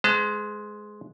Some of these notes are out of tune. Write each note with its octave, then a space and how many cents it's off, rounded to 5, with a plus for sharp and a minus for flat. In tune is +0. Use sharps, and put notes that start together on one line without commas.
G#3 +10 C5 -40 A5 +30